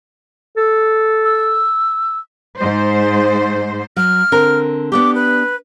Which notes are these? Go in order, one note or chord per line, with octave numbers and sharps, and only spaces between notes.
A4
E6
G#2 C5
F#3 F6
D3 C4 A#4
B3 D4 G4 D6
B4